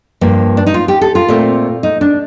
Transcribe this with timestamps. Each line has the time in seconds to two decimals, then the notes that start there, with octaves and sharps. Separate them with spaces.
0.21 G2 F3 A#3
0.57 D4
0.67 D#4
0.74 F4
0.88 G4
1.01 A4
1.15 F4
1.29 A#2 A3 C4
1.83 D#4
2.01 D4